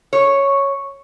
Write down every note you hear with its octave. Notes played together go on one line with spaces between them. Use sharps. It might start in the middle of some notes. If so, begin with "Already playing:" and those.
C#5